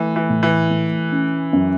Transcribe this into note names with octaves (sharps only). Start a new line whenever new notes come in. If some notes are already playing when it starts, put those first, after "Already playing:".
Already playing: E3 A3
E3
A2
E3
A3
C#4
F#2